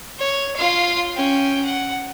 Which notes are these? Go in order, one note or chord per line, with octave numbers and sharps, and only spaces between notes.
C#5
F4 F5
C#4 G5
F#5